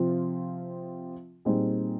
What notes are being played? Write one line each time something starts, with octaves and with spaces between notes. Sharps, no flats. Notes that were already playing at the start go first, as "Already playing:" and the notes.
Already playing: C3 F3 C4 F4
A#2 G3 C4 D#4 G#4